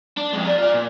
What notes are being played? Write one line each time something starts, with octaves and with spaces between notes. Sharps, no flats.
D4
F2 G#3
D5 A#5
F4 D5
A#2